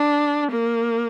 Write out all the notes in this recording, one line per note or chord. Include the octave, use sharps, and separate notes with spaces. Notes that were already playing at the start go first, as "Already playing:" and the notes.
Already playing: D4
A#3